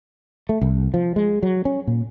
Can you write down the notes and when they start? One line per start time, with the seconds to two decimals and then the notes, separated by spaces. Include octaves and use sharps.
0.49 A3
0.61 C2
0.94 F3
1.16 G#3
1.43 F#3
1.65 C#4
1.87 A#2